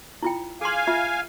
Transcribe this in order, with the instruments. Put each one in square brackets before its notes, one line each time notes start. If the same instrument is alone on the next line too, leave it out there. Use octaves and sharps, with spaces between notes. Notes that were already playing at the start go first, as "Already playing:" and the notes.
[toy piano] E4 F4 G5
[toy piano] G#4 C6 [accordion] F5 G#5
[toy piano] F4 E5